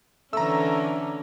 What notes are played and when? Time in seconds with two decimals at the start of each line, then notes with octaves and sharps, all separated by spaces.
0.33 D3 E3 A3 C#4 A#5 E6